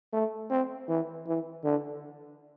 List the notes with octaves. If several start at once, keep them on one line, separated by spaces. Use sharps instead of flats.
A3
C4
E3
E3
D3